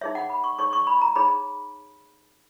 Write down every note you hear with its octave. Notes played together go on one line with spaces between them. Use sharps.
D#4 G#4 C#5 E5
F#5
B5
C#6
D#4 G#4 C#5 C#6
C#6
B5
A#5
D#4 G#4 C#5 B5